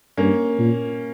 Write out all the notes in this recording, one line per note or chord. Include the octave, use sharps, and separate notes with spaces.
G2 A#3 C#4
A#2